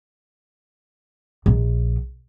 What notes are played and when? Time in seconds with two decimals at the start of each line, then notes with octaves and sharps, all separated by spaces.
1.46 A#1